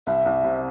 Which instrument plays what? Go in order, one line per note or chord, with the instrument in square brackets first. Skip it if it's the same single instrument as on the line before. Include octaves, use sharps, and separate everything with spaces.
[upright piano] C2 [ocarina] E5
[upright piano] C2
C3